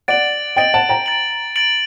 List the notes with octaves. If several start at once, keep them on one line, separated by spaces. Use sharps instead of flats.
D5 F#5 A6 D7 F#7
D#5 G5 A6 D7 F#7
F#5 A5
G5 A#5
A6 D7 F#7
A6 D7 F#7